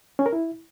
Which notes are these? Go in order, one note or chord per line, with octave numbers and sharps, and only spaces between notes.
C#4
A#4
E4